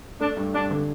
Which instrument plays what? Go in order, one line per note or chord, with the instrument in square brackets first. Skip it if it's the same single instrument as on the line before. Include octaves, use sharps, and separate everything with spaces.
[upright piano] A3 [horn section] D4
[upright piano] G2
[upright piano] G2 [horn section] D4
[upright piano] D3